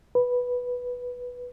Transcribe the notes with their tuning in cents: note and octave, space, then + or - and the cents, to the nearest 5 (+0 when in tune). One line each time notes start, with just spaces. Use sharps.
B4 -5